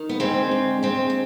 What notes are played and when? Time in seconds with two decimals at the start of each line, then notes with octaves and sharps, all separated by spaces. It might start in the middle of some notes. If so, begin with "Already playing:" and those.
Already playing: D#3
0.09 B3
0.20 D2 G#3 C4
0.51 D2
0.83 D2 G#3 C4
1.10 C4